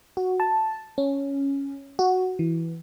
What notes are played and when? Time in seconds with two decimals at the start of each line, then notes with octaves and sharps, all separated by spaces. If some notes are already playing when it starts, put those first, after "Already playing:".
0.17 F#4
0.40 A5
0.98 C#4
1.99 F#4
2.39 E3